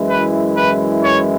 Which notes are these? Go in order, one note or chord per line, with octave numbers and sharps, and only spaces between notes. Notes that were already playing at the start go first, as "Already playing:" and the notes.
Already playing: F#2 E3 G#3 E4
B4
B4
C#5